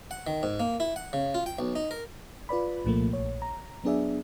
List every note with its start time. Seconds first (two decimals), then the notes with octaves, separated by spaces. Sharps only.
0.11 F#5
0.27 D#3
0.43 G#2
0.60 A#3
0.80 E4
0.96 F#5
1.13 C#3
1.34 F4
1.46 G5
1.59 B1
1.76 D#4
1.91 A#4
2.49 F4 B4 D5 B5
2.85 C2 A#2 F3 A3 A#3
3.13 A#1 C#5
3.42 A#5
3.84 F#3 B3 D4 G#4 D5 E5